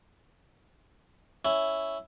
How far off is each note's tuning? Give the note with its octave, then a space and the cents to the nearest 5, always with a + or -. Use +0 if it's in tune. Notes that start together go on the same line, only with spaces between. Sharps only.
C#4 +0 E4 +0